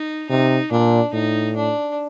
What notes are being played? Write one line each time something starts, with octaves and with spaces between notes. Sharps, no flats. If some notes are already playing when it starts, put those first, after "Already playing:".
Already playing: D#4
C3 D#4
A#2 D4
A2 D#4
D4